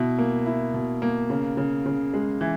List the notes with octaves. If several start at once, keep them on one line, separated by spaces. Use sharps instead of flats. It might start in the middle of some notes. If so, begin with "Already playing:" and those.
Already playing: B2 E4
A#3
E4
B2
A#3
C#3
C#3
C#3
G#3
E3